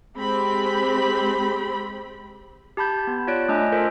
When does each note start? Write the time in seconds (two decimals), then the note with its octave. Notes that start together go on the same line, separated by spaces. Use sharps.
0.16 G#3 C4 G4 B5
2.77 G4 A5 B5 G6
3.07 B3
3.27 F4 C#5 D5 F#6 D7
3.48 A3 D4 D#5 G#5
3.72 F4 A4 A#4 C5 D#5